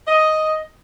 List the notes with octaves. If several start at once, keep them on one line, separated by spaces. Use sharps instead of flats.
D#5